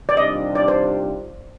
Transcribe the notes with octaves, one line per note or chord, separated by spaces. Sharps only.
D5
C3 D#3 G3 D4 F4 D#5
D5
C5